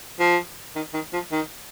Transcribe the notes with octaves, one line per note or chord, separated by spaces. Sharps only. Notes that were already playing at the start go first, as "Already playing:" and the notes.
F3
D#3
D#3
F3
D#3